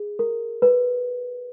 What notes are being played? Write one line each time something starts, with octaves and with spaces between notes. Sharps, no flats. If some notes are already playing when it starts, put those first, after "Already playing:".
Already playing: G#4
A#4
B4